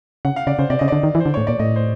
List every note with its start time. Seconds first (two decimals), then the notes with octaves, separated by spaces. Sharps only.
0.25 C#3 F#5
0.36 F5
0.47 C#3 D5
0.59 C#3 C5
0.70 C3 D5
0.79 C#3 D#5
0.88 D3 D5
1.03 D#3
1.15 E3
1.20 C5
1.26 D3
1.34 A2 C#5
1.47 A#2 D5
1.59 A2 D#5
1.76 C5